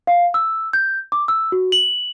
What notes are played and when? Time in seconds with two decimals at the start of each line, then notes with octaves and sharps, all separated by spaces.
0.07 F5
0.34 E6
0.73 G6
1.12 D6
1.28 E6
1.52 F#4
1.72 F#7